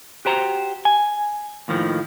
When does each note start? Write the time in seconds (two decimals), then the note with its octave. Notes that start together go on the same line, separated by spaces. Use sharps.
0.25 F#4 G4 C5 A#5
0.85 G#5
1.68 D#2 A2 D#3 F3